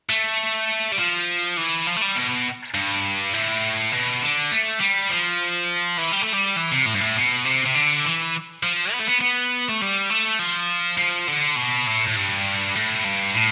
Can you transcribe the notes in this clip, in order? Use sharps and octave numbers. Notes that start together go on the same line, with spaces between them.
A3
G3
F3
E3
F3
A3
G3
B2
G2
A2
B2
D3
A3
G3
F3
E3
G3
A3
G3
E3
C3
A2
G2
A2
B2
C3
C3
D3
E3
F3
B3
A3
B3
B3
A3
G3
A3
F3
F3
D3
B2
A2
A2
G2
A2
G2
A2